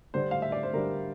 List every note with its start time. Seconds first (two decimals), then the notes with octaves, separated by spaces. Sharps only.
0.14 D3 G3 D4 C5
0.31 F5
0.42 E5
0.52 D5
0.63 C5
0.73 D3 G3 D4 A#4